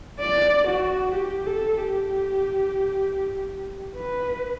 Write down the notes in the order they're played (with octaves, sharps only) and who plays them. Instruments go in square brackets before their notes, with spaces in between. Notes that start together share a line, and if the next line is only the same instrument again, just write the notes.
[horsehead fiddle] D5
F#4
G4
A4
G4
B4